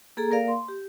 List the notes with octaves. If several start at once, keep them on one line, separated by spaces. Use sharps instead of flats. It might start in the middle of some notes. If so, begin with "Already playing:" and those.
A#3 G#4 A4 A#5
A#3 A#4 D5 F5
C6
G4